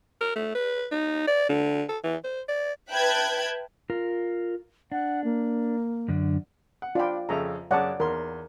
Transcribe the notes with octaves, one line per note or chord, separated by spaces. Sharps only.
A#4
A3
B4
D#4
D5
D3
A4
E3
C5
D5
B4 E5 G5 A5 F#6 G#6
F4 A#4
D4 F#5
A#3
F#2 D3 D4
F#5
D4 F4 D5 G5 B5
F2 C#3 A4 E5 A#5
F#2 C#3 C#5 D5 F#5 A5
E2 A#4 C6